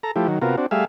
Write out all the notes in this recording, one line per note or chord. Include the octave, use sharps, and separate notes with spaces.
A4 A#5
F3 A3 E4 G4
D#3 F#3
C3 B3 F4 F#4 A#4
C4 D4 F#4
G3 A3 G#4 E5 F5